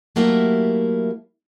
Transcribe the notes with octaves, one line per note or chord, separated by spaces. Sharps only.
F#3 A3 A#3 E4 G4 E5